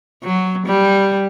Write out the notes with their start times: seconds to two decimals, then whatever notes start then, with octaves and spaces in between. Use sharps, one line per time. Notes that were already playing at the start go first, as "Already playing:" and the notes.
0.24 F#3
0.66 G3